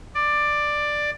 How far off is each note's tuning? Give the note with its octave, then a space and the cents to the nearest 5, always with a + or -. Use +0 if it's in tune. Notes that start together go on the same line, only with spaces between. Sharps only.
D5 +10